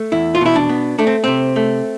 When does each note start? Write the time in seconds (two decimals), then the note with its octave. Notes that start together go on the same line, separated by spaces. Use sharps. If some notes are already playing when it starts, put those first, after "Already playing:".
Already playing: A3
0.12 E2 E4
0.35 F4
0.41 B2 E4
0.56 D4
0.69 B3
0.99 A3 D4
1.07 C4
1.24 C3 C4
1.56 A3